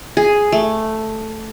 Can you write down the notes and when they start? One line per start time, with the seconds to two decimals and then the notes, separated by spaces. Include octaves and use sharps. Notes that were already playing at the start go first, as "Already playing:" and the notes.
0.17 G#4
0.52 A3